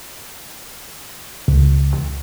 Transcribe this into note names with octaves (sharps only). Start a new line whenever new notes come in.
C#2